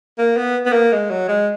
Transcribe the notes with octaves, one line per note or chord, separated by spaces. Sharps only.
A#3
B3
B3
A#3
G#3
F#3
G#3